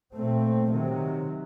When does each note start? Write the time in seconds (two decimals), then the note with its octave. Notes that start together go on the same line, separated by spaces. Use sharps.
0.14 A#2 A3 C4
0.71 C3 D#3 F#3